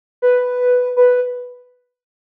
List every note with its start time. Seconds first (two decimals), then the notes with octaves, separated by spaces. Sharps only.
0.22 B4
0.97 B4